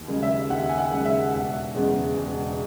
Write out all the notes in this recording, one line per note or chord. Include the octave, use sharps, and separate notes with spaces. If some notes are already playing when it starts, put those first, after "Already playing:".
Already playing: D#2
C#3 G#3
E5
D#2 F#5
G#5
F#5
C#3 G#3
E5
E1 F#5
E2 C#3 G#3
E1